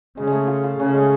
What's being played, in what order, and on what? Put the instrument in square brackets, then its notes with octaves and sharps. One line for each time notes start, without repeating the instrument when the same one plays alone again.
[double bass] C#3 [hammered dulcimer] G#3
[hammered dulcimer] G#3 A3
F4
F4
[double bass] C#3 [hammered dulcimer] C#4
[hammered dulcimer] G#3